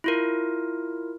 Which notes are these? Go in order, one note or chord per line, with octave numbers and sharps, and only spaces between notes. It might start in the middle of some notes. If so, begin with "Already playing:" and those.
E4 F4 A#4